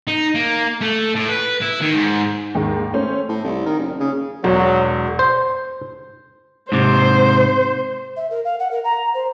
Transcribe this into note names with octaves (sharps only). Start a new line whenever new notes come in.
D#4
A#3
A3
A2
B4
E4
D#3
G#2
D#2 G#2 D#3 G#3
A3 C#4 C5
A2
C2
D#3
F#1
C#3
E1 F#3
C5
G#2 C3 C5
E5
A#4
F5
F#5
A#4
A#5
C5